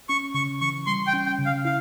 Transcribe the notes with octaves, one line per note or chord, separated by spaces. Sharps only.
C#4 C#6
C#3 C#6
E3 C#6
G3 C6
G5
C#4
G5
C#3
F5
E4 F5